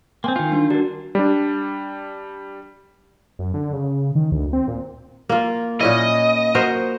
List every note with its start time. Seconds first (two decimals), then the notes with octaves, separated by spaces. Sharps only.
0.24 A#3 C4 G5 G#5 C6 G6
0.36 D#3 F4
0.52 G3 D4
0.70 D4 F#4 A#4
1.15 G3 D4
3.39 F#2
3.54 D3
3.73 C#3
4.15 D#3
4.32 D2
4.53 C4
4.68 A#2
5.29 A#3 F4
5.80 A#2 C#4 E4 D#5
6.55 F#4 A#4 C5